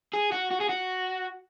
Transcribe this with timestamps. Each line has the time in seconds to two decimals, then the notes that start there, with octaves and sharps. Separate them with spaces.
0.14 G#4
0.32 F#4
0.51 F#4
0.60 G#4
0.69 F#4